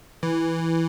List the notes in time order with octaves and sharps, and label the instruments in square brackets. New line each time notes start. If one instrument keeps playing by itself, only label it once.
[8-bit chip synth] E3